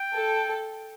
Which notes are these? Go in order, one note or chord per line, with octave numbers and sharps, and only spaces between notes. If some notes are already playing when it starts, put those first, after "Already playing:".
Already playing: G5
A4